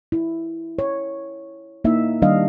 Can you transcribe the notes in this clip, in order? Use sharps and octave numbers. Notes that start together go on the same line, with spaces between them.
E4
C#5
A#3 D#4 E4 E5
D#3 G3 D4 D#5 F5